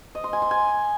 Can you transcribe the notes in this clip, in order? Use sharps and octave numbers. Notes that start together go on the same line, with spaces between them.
D#5
C6
G#5
C6
G#5